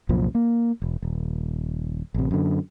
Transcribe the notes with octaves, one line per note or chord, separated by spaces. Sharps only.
C2 F#2 A#2 F3
A#3
E1
D#1
A1 C3
F#2 D3